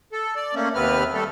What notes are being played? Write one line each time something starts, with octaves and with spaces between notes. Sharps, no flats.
A4
D5
A3 A#3 C#4
D#2 C3 B3 C4 B4 F6
G3 A3 A4